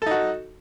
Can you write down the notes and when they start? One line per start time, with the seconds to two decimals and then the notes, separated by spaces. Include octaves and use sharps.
0.02 A4
0.06 D#4
0.11 F#4